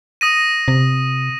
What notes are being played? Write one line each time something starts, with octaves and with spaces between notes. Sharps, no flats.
D#6 A#6 D#7
C3